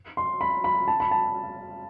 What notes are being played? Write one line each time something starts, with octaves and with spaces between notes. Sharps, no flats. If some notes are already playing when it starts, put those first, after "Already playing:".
C6
B5
B5
A5
B5
A5